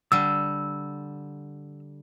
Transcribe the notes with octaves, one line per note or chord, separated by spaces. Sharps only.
D3 G3 E6